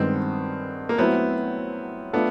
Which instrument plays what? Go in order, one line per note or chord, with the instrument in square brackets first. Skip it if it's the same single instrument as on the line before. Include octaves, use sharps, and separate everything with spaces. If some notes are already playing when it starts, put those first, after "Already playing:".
Already playing: [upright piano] G2 D#3 G#3 B3 [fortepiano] C4
[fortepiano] A#3
[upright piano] F#3 A3 C4 E4 [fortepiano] B3
[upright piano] A3 D4 F4 A4 [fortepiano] B3